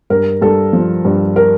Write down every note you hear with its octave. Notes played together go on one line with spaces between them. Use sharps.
G2 A#4
G2 A4
F3
G2
A#4